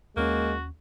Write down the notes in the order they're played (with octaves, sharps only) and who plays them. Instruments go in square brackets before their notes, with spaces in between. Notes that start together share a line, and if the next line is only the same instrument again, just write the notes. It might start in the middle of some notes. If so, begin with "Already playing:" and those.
[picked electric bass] D#2 C#4 [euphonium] G#3 [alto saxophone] A#3 [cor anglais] F#4